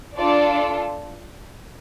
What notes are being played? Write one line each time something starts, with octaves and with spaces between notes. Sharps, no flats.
D4 F4 A4 D5